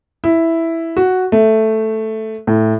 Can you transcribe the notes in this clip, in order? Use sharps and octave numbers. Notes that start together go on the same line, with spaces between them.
E4
F#4
A3
A2